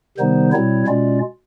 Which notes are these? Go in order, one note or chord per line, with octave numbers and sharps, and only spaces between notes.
C3 D#3 G3 B3 D#4 C5
B2 G3 C4 E4 C#5
B2 G#3 C#4 F4 D5